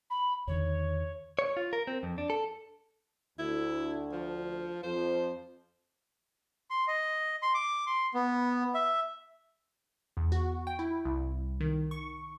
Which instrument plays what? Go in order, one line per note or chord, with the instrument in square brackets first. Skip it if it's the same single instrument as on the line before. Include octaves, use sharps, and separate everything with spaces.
[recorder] B5
[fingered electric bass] E2 D3 D#3 [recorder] C#5
[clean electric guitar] C#5
F4
A#4
C4
F2
D4
A4
[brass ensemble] D2 [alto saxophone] E4
[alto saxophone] F3
[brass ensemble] F2 F3 [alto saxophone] C5
[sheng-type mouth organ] C6
D#5
C6
D6
C6
B3
E5
[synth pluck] E2
F#4
G5
E4
C2
D#3
C#6